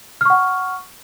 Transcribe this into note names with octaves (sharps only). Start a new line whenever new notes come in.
F#5 C#6 F6